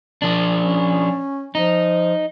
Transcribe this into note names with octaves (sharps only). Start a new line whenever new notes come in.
F3 D4
C#4
F3 D#4